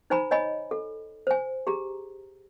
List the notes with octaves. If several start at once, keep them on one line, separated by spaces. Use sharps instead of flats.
D#4 C5 G#5 A#5 B5
C#5 D#5 G#5 B5
A4
C5 G#5
G4 G#4 A#5